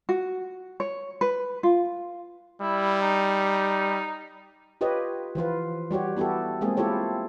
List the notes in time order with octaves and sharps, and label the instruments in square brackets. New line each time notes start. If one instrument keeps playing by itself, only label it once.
[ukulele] F#4
C#5
B4
F4
[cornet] G3 [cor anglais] E4
[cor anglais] D#4
[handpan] F4 G4 B4 C#5 D#5
E3 F3 F4 B4
G3 F#4 G4 C#5
B3 E4 F#4 G4 A4
G#3 A#3 C4 G#4
E4 F4 G4 A4 C#5